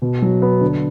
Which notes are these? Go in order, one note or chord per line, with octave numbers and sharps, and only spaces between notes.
B2
F#3
B3
D3